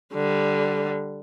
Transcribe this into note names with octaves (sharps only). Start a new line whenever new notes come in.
D3 G3